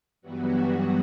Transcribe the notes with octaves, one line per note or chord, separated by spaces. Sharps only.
G2 E3 F#3 G3 B3 F#4